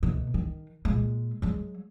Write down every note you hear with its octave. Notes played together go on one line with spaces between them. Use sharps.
D2 B2
D#3
A#2 G#3
F#3 G#3